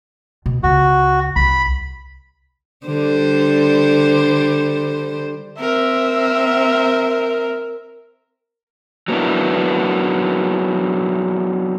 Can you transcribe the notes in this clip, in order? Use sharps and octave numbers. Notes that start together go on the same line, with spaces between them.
B2
C#2 F4 F#4
C2 B5
D3 G3 C5
C4 A#4 E5
F#3 A#3 B3 D4 E4